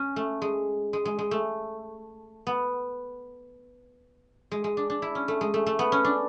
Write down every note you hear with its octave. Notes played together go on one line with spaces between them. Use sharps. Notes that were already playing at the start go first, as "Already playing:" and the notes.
Already playing: C#4
A3
G#3
G#3
G#3
G#3
A3
B3
G#3
G#3
D4
D4
E4
C#4
A3
G#3
A3
A3
B3
C#4
D4